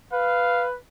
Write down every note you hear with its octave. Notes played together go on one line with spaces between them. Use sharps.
B4 F5